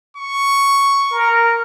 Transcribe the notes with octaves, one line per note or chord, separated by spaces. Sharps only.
C#6
A#4